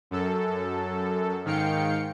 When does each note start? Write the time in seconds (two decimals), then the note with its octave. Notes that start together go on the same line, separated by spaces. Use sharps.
0.11 F#2 A4
1.45 G#2 D#3 F5 G5 C#7